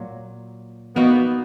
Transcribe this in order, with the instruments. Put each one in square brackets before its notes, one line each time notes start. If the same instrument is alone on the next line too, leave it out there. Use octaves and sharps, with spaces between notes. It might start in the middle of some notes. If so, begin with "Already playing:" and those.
Already playing: [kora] A#2 F#3 A#3
[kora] A#3 D#4 F#4 [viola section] B3